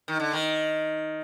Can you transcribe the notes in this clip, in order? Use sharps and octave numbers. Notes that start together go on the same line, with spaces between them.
D#3
D3
D#3